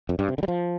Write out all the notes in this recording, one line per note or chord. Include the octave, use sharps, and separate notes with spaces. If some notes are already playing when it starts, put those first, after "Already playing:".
F2
G2
C3
D3
G3
F3